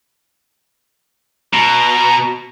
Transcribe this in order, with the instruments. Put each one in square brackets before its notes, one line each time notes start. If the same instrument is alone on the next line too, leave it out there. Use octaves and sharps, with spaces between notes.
[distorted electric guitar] B2 [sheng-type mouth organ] A#5